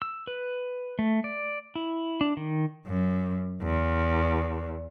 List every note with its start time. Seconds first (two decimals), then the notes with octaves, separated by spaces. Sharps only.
0.02 E6
0.27 B4
0.99 A3
1.24 D5
1.75 E4
2.21 D4
2.37 D#3
2.87 F#2
3.63 E2